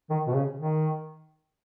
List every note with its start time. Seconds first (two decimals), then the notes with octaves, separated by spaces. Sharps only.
0.10 D#3
0.27 B2
0.34 C#3
0.59 D#3